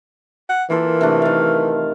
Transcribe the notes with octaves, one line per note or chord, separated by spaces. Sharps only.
F#5
E3 A#3 F4 A4
C3 A3 D4
D#3 F5